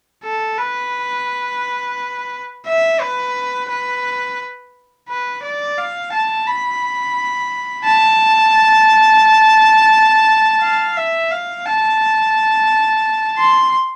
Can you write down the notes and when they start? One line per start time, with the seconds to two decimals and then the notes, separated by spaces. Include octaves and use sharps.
0.24 A4
0.58 B4
2.66 E5
3.01 B4
3.70 B4
5.09 B4
5.43 D5
5.78 F5
6.13 A5
6.47 B5
7.85 A5
10.61 F5
10.97 E5
11.31 F5
11.65 A5
13.39 C6